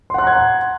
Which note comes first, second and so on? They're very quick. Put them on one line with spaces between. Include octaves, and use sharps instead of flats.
C6 F#5 F#6 A#5 G#6